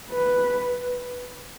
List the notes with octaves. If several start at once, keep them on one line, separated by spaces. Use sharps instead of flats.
B4